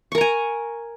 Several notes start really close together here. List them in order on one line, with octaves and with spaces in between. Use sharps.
C#6 A#4 A#5 G#5